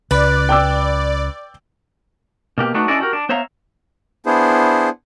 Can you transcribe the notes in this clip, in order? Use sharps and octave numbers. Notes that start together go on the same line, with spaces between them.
C#2 B4 D5
G5 D6 E6
B2 A#3 G4
A3 D4 D#4 F#4 B4
C#4 D4 E4 A4 D5 D#5
F#4 G4 A#4
D4
B3 C5 C#5 E5 F5 A#5
B3 D4 E4 G#4 C5